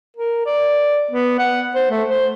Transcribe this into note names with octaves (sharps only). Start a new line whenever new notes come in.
A#4
D5
B3
F#5
C5
A3
C5